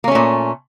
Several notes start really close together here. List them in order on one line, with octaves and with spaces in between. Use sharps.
A#3 C#4 A3 A#2